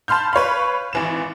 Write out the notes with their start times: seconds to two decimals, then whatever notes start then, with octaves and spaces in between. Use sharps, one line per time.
0.08 A5 B5 C6 F6 G6
0.33 B4 C#5 F5 B5
0.93 G#1 E3 E7